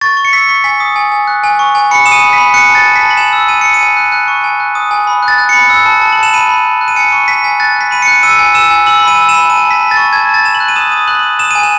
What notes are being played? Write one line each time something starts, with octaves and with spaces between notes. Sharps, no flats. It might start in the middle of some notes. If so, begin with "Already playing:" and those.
C#6 A6
C#6
C#7
E6 B6
C#6
G#5 B6
D#6
G#5
G#5
F#6
G#5
C#6
G#5
B5 C#7
D#6 E7
D#7
B5
B5 B6
F#6 C#7
A5
A6
A5
B6
A5
F#7
G#5 E7
E6
G#5 D#7
E6 C#7
D#7
G#5
F#6
F#6
C#6
G#5
F#6
D#6
G#5
B5
F#6
A6
F#6
B5 C#7
E6
A5
A5
F#7
A5
E7
B5 D#7
B5
F#6
F#6
D#7
G#5 C#7
C#6
G#5 B6
G#5
F#6 A6
F#6 B6
B5 D#7
C#7
F#6
E6 D#7
G#5
E6 E7
G#5
E6 F#7
B5 D#7
E6
E7
B5
A5 D#7
A5
B6
A5
A6
C#6
A5 G#6
A5
A6
A5 E7
F#7
F#6
D#7
D#6 E7
D#6
F#6 F#7
D#6
D#6 E7
G#5 D#7
E7